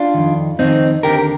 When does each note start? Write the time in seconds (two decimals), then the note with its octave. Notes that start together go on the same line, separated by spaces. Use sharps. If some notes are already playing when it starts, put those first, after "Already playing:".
Already playing: D4 F4
0.14 F2 D#3
0.59 F2 D#3 C4 D#4
1.03 D#2 D3 G4 A#4
1.19 A#4